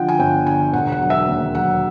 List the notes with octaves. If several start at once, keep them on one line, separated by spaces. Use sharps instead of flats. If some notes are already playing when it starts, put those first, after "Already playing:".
Already playing: D3 F3 F#5 G5
G#5
G1 G5
D3 G#5
E1 F#5
F#5
F#3
E5
D#2
F#3 F#5